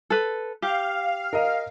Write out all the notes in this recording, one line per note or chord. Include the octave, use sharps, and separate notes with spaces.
A4 B4
G4 F5
A#4 D#5